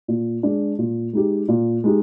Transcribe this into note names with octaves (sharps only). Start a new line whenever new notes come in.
A#2
G#3 D4
A#2
G#3 D#4 G4
A#2
G#3 D#4 G4